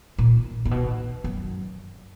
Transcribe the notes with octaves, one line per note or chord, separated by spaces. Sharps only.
A#2
A#2
B2
F#2